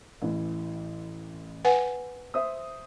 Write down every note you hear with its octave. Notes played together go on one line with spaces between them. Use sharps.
A1 E3
B4 F#5 G#5
C5 E5 D#6